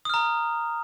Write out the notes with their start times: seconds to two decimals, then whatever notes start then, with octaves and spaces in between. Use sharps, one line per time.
0.05 D#6
0.10 F6
0.14 A#5